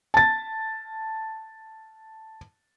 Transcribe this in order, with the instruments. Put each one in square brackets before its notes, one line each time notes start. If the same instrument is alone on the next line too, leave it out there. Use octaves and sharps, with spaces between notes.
[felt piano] A5 A6